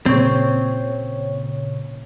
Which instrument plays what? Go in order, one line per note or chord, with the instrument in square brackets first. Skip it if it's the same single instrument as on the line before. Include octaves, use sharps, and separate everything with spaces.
[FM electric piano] A#2 C#3 C#5 [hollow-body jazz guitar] C4